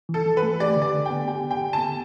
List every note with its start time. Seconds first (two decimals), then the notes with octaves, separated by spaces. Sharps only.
0.09 E3
0.14 A4
0.26 E3
0.37 B4
0.43 A3
0.60 G4 D5
0.76 D3
0.82 D5
0.93 D3
1.05 G5
1.11 B3
1.28 G4 G5
1.45 D3
1.51 G5
1.61 D3
1.73 B3 A5